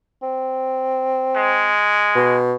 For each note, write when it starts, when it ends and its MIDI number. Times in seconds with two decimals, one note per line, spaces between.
0.22 1.75 60
1.36 2.38 56
2.16 2.55 47